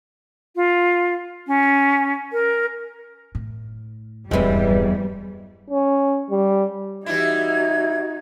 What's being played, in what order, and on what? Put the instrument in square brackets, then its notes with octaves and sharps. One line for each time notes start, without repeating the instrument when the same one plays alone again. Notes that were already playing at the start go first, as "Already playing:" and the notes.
[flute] F4
C#4
A#4
[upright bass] A2
[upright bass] D#1 G2 [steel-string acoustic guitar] E2 G#3 [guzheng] E3 C4 [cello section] G3
[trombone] C#4
G3
[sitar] E3 G3 E4 [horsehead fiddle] D#4 F#4 [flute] G#6